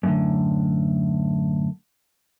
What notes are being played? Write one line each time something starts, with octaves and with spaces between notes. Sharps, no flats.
F#2 A2 D3